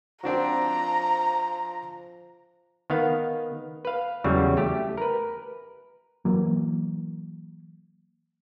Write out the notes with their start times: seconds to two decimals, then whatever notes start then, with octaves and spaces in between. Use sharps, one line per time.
0.24 F3 C4 D4 F#4 A#5
2.90 D#3 B3 F5
3.85 B4 F5
4.24 E2 C#3 F#3 G3
4.57 A3 G4
4.98 A#4 B4
6.25 E3 F#3 A#3